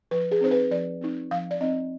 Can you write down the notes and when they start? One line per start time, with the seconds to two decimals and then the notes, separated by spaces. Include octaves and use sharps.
0.11 F3 B4
0.31 G#4
0.41 C4 D#4 C5
0.51 B4
0.71 F3 D5
1.01 C4 D#4
1.31 F3 F5
1.51 D5
1.61 C4 D#4 D#5